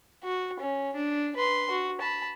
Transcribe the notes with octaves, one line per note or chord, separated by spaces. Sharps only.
F#4
C#4
D4
B4 C6
F#4
A5 B5